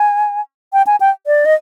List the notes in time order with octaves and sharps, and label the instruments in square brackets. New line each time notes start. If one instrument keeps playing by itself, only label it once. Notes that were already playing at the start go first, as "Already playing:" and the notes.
Already playing: [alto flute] G#5
G5
G#5
G5
D5
D#5